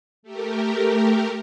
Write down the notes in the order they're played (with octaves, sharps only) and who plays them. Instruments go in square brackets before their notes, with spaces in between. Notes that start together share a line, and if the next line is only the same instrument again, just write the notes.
[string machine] A3 G4 A#4